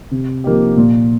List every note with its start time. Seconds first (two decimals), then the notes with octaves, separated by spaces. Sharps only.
0.11 C3
0.44 F3 A#3 D#4 G4
0.77 A#2